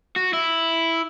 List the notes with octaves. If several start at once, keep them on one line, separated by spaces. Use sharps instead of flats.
F#4
E4